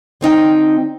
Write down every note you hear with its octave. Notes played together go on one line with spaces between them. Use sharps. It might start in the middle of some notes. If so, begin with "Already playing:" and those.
D3 C4 D#4 G5